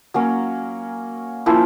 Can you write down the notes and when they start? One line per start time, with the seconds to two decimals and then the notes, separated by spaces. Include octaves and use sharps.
0.14 F#3 A#3 C#4
1.46 F3 A#3 C#4 E4